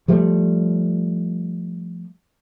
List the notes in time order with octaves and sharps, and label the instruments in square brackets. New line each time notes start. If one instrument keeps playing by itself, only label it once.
[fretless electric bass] F3 G3 A3